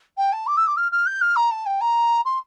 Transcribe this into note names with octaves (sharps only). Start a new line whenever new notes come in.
G5
A5
D6
E6
D6
F6
F6
G6
F6
A#5
A5
G5
A#5
C6